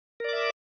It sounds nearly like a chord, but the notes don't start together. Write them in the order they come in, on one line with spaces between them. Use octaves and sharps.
A#4 D5 D6 E5